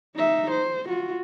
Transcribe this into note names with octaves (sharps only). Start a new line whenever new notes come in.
D#4 E5
C5
F4 F#4